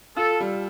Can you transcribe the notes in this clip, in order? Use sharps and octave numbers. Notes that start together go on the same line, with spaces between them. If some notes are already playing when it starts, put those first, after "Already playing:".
F4 A4
G3